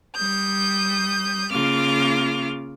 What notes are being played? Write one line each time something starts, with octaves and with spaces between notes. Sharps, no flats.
G3 D#6 G6
C#3 A#3 F4 D6 F6